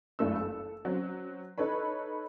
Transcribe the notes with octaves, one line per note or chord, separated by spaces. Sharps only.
F#1 C#2 G2 A3 D4 E6
A4
F#3 C4 C#4
D#4 A4 B4 C#5 B5